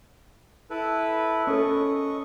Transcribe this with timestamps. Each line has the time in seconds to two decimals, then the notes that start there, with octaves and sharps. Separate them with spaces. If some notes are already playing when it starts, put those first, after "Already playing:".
0.70 E4 A4 B4
1.47 C#4 A4 D#5 C#6